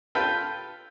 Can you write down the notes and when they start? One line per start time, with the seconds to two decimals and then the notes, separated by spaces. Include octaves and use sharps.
0.15 F4 A4 B4 F5 G5